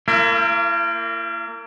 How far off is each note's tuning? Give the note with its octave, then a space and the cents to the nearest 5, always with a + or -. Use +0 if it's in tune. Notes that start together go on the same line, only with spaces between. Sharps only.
A#3 -30 E4 +40